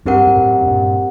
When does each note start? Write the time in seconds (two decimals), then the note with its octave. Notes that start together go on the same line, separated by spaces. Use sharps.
0.05 G2 C4 G4 A#4 F#5
0.27 G2
0.36 F#2 A2
0.60 A2
0.67 G2 A#2